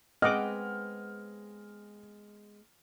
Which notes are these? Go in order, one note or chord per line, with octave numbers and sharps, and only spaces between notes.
G#3 B3 C4 D#5 F#5 D6 F6